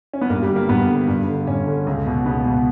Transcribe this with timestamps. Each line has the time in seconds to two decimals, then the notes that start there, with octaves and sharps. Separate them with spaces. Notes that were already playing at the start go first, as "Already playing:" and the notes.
0.13 C#4
0.22 B3
0.30 G2 A#3
0.42 G3
0.49 D3
0.56 A#3
0.69 G2 B3
0.89 D3
1.08 G2
1.28 D3
1.47 G2 C#4
1.67 D3
1.87 C#2
2.06 B2
2.26 C#2 B3
2.45 B2